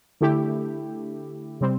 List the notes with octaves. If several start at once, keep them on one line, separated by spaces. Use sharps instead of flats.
D3 A3 E4 G4
C3 G3 C4